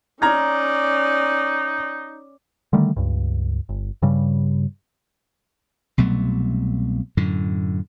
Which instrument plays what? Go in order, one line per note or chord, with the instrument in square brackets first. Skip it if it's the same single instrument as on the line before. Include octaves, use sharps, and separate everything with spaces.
[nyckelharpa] C#4 D5 [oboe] D#4 [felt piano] A#5 F6 G#6
[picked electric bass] D3 D#3 G3 A3
C#2 G2
G1
G2 C#3 G3
[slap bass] C2 B2 F#3 A3
F#2 A2 D3